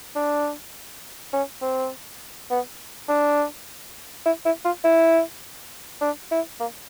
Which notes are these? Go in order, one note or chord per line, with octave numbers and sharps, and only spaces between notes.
D4
C#4
C4
B3
D4
E4
E4
F4
E4
D4
E4
A#3